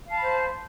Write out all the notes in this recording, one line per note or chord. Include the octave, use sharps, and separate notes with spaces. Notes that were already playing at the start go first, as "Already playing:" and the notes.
C5 F5 A5 B5